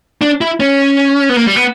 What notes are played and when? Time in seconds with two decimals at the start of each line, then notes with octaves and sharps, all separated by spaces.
0.22 D4
0.41 E4
0.60 C#4
1.29 B3
1.36 A#3
1.47 G3
1.56 B3